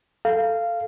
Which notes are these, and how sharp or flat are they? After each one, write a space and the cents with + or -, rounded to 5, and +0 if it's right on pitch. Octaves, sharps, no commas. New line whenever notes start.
A4 +5 F5 -15